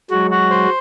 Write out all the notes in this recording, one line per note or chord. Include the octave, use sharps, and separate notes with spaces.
F#3 G#3 F#4
F#4
C5